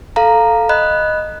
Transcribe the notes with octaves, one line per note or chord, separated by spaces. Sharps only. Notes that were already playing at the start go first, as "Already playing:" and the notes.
A4 F5 A#5
D#5 B5 F#6